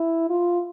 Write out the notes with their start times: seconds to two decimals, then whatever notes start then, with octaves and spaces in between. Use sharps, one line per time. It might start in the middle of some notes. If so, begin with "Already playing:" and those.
Already playing: E4
0.30 F4